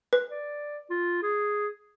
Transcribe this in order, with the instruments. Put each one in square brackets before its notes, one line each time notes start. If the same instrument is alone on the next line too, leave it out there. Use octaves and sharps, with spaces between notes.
[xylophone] B4
[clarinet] D5
F4
G#4